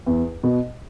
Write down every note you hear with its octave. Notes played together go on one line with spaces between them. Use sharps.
E2
B2